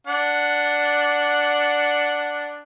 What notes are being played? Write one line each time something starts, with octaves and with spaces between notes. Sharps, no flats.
D4 F#5